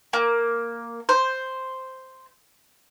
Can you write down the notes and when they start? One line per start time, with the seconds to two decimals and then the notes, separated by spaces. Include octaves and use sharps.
0.13 A#3
1.09 C5